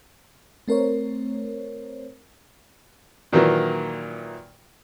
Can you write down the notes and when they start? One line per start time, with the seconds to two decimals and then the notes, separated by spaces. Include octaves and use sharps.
0.68 A3 C4 A#4 C5 C#5
3.33 A#2 D#3 E3 F#3 A#3